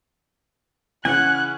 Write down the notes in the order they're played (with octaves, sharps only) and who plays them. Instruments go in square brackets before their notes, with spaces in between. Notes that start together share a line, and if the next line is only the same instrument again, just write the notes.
[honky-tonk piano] C#3 E3 C#4 [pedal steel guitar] F#5 G#5 [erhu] F#6